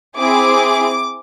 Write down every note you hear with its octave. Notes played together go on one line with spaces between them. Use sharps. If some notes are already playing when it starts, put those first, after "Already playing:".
C4 E4 G#4 D6